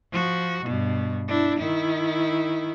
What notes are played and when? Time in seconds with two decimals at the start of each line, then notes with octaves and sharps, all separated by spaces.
0.12 F3 F#4
0.66 G2 B2
1.28 D4 E4
1.59 D#3 E4